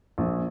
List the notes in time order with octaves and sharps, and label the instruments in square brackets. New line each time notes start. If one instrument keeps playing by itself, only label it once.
[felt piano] A#1